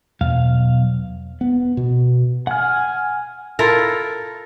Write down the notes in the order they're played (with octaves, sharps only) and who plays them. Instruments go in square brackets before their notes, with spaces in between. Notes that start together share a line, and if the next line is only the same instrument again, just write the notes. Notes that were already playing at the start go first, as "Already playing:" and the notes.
[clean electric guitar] B1 F5 [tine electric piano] E2
[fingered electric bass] B3
B2
[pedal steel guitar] F#5 F6 [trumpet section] G#5
[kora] E4 F4 A4 A#4